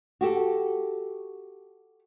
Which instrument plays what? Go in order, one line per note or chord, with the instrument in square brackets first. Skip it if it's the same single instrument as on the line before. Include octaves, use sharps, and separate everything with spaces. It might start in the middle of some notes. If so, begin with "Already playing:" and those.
[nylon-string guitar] F#4 G4 A4